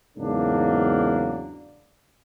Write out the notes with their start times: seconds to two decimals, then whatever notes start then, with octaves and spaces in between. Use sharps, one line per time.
0.17 E2 G#2 C#3 F#3 A#3 D4